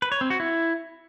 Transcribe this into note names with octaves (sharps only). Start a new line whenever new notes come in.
B4
C#5
C4
F#4
E4